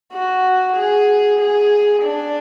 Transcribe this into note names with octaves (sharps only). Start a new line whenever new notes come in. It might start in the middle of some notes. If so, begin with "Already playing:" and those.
F#4
G#4
G#4
D4